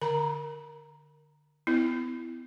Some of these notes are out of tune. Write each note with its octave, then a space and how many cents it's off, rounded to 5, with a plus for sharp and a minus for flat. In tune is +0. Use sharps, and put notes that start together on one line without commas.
D3 +10 A#5 +0
B3 +40 E4 +0